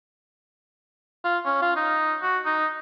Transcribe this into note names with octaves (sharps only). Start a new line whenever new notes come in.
F4
C#4
F4
D#4
F#4
D#4